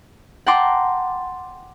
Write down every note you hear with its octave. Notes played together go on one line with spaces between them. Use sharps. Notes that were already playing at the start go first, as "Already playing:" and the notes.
F#5 G5 A5 A#5 C6 D6